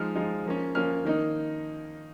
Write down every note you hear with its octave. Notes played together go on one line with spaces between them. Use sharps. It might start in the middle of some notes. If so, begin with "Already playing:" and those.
Already playing: F3 G#3 D#4 F6
F3 G#3 D#4
F3 A#3 C#4
F3 A#3 C#4 F6
D#3 A#3 D#4